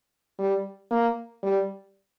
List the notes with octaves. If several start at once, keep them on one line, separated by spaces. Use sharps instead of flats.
G3
A#3
G3